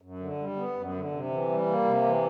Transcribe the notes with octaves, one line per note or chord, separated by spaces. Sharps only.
F#2
D3
G3
B3
F#2
D3
C3
E3
G3
A#3
C3
E3